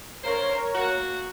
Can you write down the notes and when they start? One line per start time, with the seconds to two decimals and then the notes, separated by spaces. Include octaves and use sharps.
0.24 D3 A#3 A#4 C5 C#5
0.75 A#3 F#4